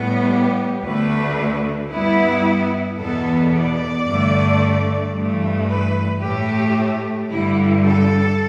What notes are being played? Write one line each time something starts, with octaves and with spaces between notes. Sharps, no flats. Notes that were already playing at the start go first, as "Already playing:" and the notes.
Already playing: A2 G3 B3
G4
D2 D3 A3 B4
G2 G3 B3 E4
E2 B2 B3 A4
D5
G2 D3 A3
G2 E3 A3
B4
A2 A3 G4
G2 D3 G3 E4
A4